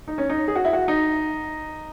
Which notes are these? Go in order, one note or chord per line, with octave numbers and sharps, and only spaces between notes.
D#4
C#4
D#4
G#4
F#4
E4
F#4
D#4